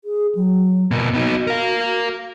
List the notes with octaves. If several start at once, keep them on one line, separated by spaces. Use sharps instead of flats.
G#4
F#3
B2 A#3
B3 D#4 F#4
A#4 F5